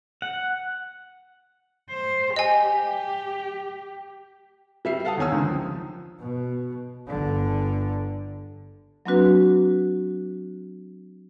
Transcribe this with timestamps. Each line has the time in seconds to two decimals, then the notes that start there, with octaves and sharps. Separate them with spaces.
0.22 F#5
1.90 C5
2.36 G4 D#5 G#5
4.85 G3 E5 C7
5.05 A4 F5 F#5 A5 D#6
5.18 E2 D#3 C#5 G#5 D#6 E6
5.32 C#2 D3 D#3
5.45 F3
6.19 B2
7.07 G1 D3
9.06 F#3 A#3 C4 D4 F#4 B4